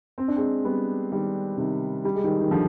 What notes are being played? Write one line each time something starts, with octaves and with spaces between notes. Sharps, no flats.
C4
D4
G#3 C4
G3 B3
D#3 G3
C3 D#3
G3
G#3
D#3 G3
D#3
D3 F3